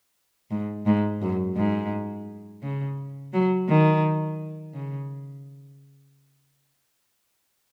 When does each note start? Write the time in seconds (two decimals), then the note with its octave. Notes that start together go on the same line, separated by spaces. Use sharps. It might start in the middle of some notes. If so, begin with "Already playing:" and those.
0.51 G#2
0.86 G#2
1.22 F#2
1.56 G#2
2.62 C#3
3.33 F#3
3.68 D#3
4.74 C#3